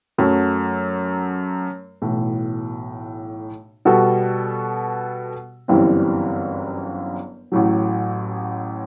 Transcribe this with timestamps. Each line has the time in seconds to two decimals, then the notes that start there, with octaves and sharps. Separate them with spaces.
0.18 F#2 F#3 A3
2.02 B1 A2 E3
3.85 B2 G3 B3 F#4 A4
5.68 G1 F#2 E3 G3 C4
7.52 A1 A2 F#3